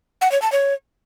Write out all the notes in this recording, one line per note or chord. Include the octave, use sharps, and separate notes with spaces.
F#5
C#5
A5
C#5